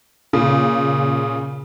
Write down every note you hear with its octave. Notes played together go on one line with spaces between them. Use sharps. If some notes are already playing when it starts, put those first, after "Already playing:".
A#2 C#3